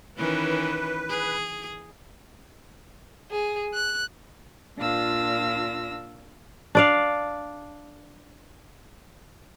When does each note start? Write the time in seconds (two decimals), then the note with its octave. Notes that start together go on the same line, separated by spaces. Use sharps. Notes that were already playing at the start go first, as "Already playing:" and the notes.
0.17 D#3 E3 C#4 B4
1.09 G#4
3.31 G#4
3.74 F#6
4.78 A#2 D4 F4 F5 E6 A#6
6.75 D4 D5 F5